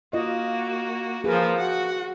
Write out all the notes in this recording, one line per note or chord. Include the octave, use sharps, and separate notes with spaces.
A#3 F4 F#4 D#5
F3 A#3 G#4 A#4 B4
F#4 F#5